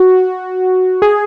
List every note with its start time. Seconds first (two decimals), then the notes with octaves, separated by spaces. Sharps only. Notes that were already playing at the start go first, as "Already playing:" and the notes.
Already playing: F#4
1.02 G#4